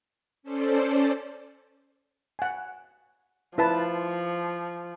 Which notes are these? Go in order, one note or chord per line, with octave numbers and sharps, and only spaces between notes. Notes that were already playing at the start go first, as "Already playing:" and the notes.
C#4 A4 C5 D5
F#5 G#5
F3 E4 B4 A5